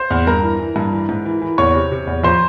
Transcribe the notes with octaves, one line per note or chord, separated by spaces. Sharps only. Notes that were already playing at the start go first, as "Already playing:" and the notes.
Already playing: C5 C6
E2
G2 A#4 A#5
E3
E3
G2
E3
G#2
E3
E3
E2 C#5 C#6
C3
C3
E2
F2 C5 C6